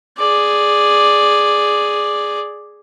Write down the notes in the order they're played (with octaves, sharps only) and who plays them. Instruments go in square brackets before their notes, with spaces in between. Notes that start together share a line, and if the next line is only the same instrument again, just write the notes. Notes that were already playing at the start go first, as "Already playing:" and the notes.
[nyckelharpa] G#4 D5